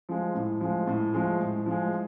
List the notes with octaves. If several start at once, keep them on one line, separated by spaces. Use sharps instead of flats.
F3 G#3
A2
F3 G#3
A2
F3 G#3
A2
F3 G#3